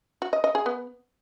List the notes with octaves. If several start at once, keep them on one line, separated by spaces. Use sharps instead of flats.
F#4
D#5
D#5
G#4
B3